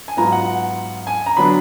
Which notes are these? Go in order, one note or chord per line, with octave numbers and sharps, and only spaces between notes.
G#5
G#2 F#3 B3 F4 A#5
F#5
G#5
A#5
D3 F#3 B3 D4 B5